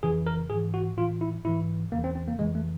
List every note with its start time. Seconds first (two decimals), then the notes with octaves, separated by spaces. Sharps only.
0.03 F2 C#3 E3 G#4
0.27 A#4
0.50 G#2 E3 G#4
0.74 F#4
0.97 A2 E3 F4
1.21 E4
1.45 G#2 E3 E4
1.92 E2 C#3 E3 A#3
2.04 C4
2.15 C4
2.28 A#3
2.39 F2 C#3 E3 G#3
2.55 A3